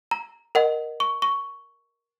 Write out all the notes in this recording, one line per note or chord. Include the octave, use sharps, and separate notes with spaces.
A#5
A#4 D#5 F#5
C#6
C#6